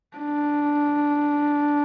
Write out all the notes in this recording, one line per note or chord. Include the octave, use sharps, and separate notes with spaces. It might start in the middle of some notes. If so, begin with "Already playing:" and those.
D4